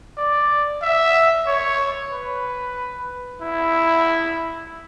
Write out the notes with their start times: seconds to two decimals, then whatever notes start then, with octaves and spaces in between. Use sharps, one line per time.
0.18 D5
0.82 E5
1.47 C#5
2.12 B4
3.42 E4